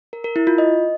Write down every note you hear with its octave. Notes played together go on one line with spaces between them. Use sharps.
A#4
A#4
E4
F4
D#5